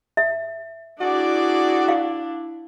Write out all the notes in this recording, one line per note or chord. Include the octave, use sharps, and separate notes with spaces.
E5
D4 E4 F#4 G#4 D5
F5